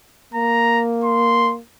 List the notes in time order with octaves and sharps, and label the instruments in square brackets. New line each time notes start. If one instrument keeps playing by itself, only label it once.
[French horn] A#3 [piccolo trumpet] A#5
[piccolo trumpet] C6